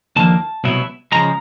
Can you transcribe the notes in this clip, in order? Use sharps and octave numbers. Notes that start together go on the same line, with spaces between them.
D#2 D3 F3 A#3 A5
C2 B2 F#3 B3 E4
C#3 F3 G#3 A#5